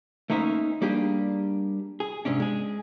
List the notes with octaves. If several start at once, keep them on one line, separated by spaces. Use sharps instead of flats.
A3 A#3 C#4 D#4 C5 E5
G3 A#3 D4 G4 G#4
G#4
G#2 C3 C#4 D4
G#3 G#4